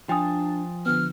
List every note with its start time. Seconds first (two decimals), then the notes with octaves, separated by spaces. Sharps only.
0.09 F3 D4 G5 G#5 D#6 A6
0.86 D3 F3 B3 F6